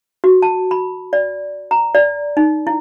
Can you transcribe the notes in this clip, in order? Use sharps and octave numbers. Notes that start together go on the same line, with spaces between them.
F#4
A5
B5
D5
A#5
D5
D#4
E4